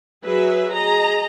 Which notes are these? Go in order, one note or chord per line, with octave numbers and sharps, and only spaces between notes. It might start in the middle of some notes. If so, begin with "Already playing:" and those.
F#3 G#4 B4 E5
G#4 D#5 A#5